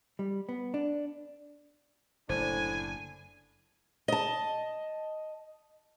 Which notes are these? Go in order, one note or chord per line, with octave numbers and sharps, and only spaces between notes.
G3
B3
D4
F#1 A2 D3 D4 C5 G#5
D#5 A5